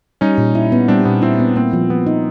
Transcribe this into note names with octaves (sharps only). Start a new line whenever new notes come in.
G3 C#4 D#4
A#2
E4
B3
G3 C4 D4
A#2 B3
C4 E4
B3
A#3 C4
F3
F3 B3
D#4